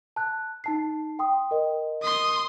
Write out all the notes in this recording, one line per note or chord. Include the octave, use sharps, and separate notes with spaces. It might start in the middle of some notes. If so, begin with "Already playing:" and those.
A5 F#6
D#4 A5 C7
G5 C6 D#6
A#4 D#5
C6 D#6